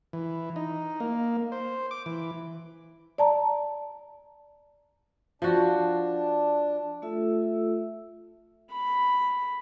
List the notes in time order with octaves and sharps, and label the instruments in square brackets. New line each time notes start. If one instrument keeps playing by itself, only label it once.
[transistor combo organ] E3
D#4
A#3
C5
D6
E3
[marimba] D5 A5 A#5
[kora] F3 F#4 [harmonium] D4
[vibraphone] A3 F4 A4 E5 E6
[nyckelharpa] B5